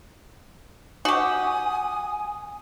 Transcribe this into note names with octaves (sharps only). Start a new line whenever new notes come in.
F#4 G4 G#5 D#6